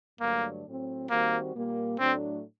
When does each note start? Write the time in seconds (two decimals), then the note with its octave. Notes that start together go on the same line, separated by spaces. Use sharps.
0.20 G2 D3 F#3 A3 A#3 D4
0.66 A2 F#3 C4
1.10 D#3 G3 A#3 C4 F#4 C5
1.54 A#2 G3 A#3
1.99 A2 F#3 A3 C4 D4